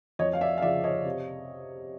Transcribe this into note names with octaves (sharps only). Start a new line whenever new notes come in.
F2 C#5 D#5
F5
D5 E5
F5
C#3 F3 D5 E5
C#5 D#5
C3